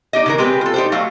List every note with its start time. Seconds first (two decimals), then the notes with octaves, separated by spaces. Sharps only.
0.13 D#4 G4 D#5
0.26 C#3 E3 A#4
0.38 G#3 C4 G4 B4
0.61 F4 A4
0.74 D#4 G4 C5
0.92 F#3 A3 F#4 F5